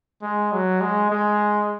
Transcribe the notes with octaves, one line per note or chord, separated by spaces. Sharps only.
G#3
F#3
G#3
G#3